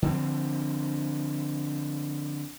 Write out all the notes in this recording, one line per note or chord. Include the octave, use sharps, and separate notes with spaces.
D3 F3 C4